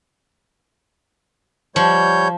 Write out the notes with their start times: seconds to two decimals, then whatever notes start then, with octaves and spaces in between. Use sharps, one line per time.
1.76 F3 G3 C#5 G6